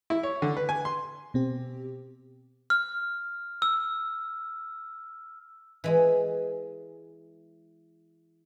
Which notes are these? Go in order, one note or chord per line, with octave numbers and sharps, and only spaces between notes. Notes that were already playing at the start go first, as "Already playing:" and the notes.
E4
C#5
D3
B4
G#5
C6
B2 C4 G4
F6
E6
E3 G#3 G#4